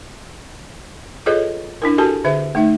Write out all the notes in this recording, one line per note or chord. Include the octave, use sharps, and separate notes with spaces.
F4 G#4 A4 B4 C#5 D#5
D4 E4 A#4
F#4 G4 A4 A#4 G#5 A5
D3 G#4 B4 E5
A3 D#4 E5